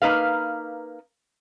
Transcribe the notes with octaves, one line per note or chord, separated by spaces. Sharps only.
A#3 D#4 B4 F5